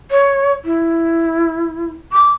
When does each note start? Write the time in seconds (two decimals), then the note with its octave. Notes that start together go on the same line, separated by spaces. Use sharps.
0.11 C#5
0.65 E4
2.13 D6